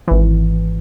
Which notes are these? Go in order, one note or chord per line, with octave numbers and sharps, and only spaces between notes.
G#1 E3